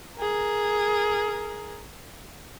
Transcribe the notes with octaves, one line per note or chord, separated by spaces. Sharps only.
G#4 A#4